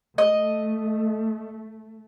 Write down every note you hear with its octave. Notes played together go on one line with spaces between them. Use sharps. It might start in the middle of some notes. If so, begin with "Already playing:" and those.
A3 D#5